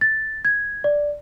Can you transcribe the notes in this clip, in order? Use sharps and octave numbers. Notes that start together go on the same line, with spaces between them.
A6
G#6
D5